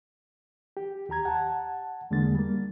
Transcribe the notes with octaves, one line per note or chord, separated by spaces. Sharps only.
G4
D#2 G4 A#5 G#6
F#5 A5
E2 D3 G#3 A#3 A6
G3 A#3